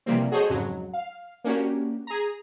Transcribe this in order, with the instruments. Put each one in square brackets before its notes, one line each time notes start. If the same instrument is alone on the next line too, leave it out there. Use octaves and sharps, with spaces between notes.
[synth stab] C3 E3 F3 G3 A#3 C4
F#4 G#4 A4 C5 C#5 D#5
F2 G#2 C#3 F#3
F5
A#3 C#4 D4 F#4 G4
G#4 A#5